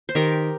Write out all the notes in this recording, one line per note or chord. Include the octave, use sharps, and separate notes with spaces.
C5
D#3 G4 A#4